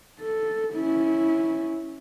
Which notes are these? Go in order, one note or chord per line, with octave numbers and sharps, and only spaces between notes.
A4
C#4 E4